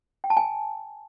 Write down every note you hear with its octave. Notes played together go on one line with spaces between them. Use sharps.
G5
A5
G#5